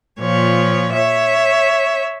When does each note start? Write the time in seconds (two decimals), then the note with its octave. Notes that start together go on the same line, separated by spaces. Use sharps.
0.20 A#2 F3 C#5
0.93 C#5 E5